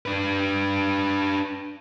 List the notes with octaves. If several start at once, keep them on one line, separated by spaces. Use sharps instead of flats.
D4 B4